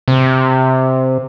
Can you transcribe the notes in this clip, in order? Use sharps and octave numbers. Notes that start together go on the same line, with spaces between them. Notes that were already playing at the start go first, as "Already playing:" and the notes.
C3